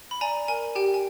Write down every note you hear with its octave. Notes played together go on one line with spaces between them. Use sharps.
B5
D5 G#5 A#5
A#4 G#5
G4 G5
G#5